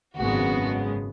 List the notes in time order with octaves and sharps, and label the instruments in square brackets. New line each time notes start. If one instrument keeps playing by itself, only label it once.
[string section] G#1 F#2 C#3 G#3 B3 F#4